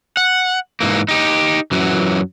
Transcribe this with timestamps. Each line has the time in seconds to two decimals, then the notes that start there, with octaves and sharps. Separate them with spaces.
0.17 F#5
0.81 G#2 E3 A#3
1.08 D#4 G4
1.71 F#2 E3 F#3